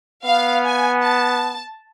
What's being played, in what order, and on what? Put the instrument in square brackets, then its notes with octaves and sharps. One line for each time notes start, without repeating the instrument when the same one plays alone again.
[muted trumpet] B3 [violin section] F5
[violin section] G#5
A5